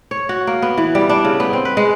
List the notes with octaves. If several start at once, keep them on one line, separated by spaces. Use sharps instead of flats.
C#5
F#4
A#3
B3
E3
G3
D4
C#3
B3
C4
B4
G#3